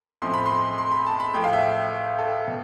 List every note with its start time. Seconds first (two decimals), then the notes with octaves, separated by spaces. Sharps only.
0.22 B1 A2 F3 A3 C4 C6
0.34 B5
0.46 C6
0.78 C6
0.92 B5
1.07 A5
1.20 B5
1.34 A1 A2 F3 A3 G5
1.44 F5
1.53 E5
2.19 A4
2.48 B2